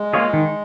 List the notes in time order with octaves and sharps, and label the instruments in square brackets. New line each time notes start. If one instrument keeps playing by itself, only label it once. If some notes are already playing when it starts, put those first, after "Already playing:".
Already playing: [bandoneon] G#3
[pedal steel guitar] A#3 F4 G#4 C#5
D#3